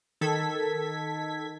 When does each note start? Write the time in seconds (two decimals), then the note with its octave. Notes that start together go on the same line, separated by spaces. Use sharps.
0.21 D#3 A4 G#6 B6